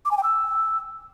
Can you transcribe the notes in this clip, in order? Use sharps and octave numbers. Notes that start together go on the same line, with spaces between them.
D6
G#5
G5
E6